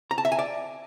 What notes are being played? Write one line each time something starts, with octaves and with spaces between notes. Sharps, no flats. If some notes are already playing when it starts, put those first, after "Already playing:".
A#5
A5
E5
G#5
D5